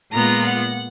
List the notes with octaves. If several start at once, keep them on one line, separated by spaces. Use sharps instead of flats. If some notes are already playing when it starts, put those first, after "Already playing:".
A#2 G#3 B3 F4 A#5
F#5